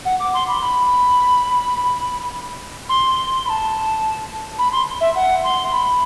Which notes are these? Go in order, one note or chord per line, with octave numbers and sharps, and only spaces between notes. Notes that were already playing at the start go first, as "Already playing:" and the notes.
F#5
D6
C6
B5
B5
C6
B5
A5
B5
C6
E5
F#5
C6
B5